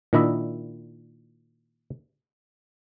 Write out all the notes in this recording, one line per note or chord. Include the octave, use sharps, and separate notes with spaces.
A#2 D#3 D4 E4 D#5 E5